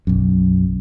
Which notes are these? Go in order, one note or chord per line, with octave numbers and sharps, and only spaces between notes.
B1 F#2